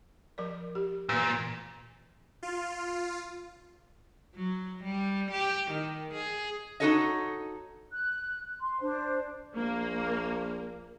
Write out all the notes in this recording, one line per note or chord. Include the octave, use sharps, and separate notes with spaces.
F3 A#4 D5
G4
A#2 E3 B4
F4
F#3
G3
G4
D#3
G#4
D#4 E4 F#4 A4 C#5 D#5
F#6
C6
D4 C5
A#1 A#3